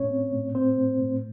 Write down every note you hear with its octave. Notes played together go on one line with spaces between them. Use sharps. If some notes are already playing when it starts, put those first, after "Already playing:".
Already playing: A2 C#4 C#5
C4
A2
A2 C4 C5
A2
A2